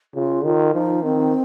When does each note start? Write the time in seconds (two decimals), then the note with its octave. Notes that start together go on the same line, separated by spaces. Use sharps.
0.14 C#3 F4
0.44 D#3 F4
0.73 F3 D#4
1.03 D#3 C4